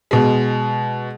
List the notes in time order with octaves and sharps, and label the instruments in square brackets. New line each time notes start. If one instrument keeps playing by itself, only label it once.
[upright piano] B2 G#3